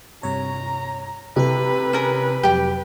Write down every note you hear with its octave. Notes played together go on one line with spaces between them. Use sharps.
G2 C3 C#5 A#5
C3 E4 A4 B4
C#4 A#4
F2 C3 F#3 G4 G5